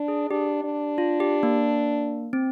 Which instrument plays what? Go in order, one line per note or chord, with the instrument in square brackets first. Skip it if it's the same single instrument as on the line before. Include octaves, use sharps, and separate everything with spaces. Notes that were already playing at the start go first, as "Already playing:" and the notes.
Already playing: [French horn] D4
[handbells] G#4
[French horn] D4 [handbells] G4
[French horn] D4
[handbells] F4
G4
A#3
C4